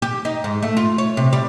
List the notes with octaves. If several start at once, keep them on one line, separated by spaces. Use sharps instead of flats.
G4
D#4
G#2
A3
F4
C#5
C3
G3